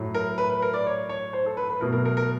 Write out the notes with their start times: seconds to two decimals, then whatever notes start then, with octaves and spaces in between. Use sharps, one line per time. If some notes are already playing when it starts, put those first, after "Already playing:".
Already playing: A2 F#3 A3
0.14 A#4
0.38 B4
0.50 B4
0.62 A#4
0.74 D5
0.87 C#5
1.09 C#5
1.33 C5
1.46 A4
1.57 B4
1.70 B4
1.81 B2 F#3 A3 A#4
1.93 A#4
2.05 A#4
2.17 A#4